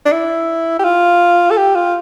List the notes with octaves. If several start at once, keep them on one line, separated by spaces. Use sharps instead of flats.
D4
E4
G4
F4
A4
G4
F4